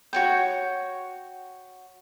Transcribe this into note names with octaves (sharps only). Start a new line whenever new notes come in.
F#4 C#5 G5